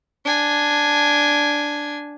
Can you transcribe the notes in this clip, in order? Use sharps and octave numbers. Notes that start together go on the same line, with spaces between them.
D4 G#5